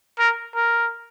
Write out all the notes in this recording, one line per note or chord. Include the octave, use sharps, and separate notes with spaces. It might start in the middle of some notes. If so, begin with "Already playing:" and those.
A#4
A#4